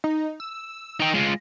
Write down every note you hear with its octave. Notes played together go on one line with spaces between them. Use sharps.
D#4
E6
D#4 G5
G#3 F4